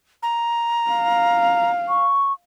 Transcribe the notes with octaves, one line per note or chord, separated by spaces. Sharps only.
A#5
F5
C#6